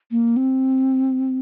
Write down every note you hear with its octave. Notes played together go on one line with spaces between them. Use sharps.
A#3
C4